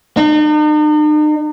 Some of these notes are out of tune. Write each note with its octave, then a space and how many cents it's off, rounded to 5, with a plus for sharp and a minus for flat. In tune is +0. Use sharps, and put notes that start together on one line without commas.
D#4 -45